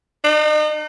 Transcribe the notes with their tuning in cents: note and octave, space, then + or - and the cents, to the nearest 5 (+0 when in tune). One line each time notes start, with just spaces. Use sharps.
D#4 -40